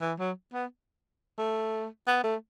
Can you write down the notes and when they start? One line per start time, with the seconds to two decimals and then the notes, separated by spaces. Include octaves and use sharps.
0.01 E3
0.19 F#3
0.53 B3
1.38 A3
2.07 B3
2.24 A3